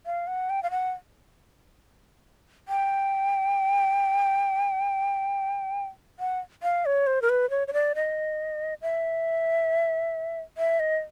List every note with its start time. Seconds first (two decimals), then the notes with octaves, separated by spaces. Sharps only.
0.06 F5
0.27 F#5
0.50 G5
0.63 F5
0.71 F#5
2.68 G5
6.20 F#5
6.63 F5
6.86 C#5
7.07 C5
7.22 A#4
7.29 B4
7.50 C#5
7.68 C#5
7.73 D5
7.95 D#5
8.82 E5
10.58 E5
10.80 D#5